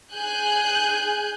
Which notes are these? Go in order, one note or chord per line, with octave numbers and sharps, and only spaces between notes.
G#4 G#5 F#6 G6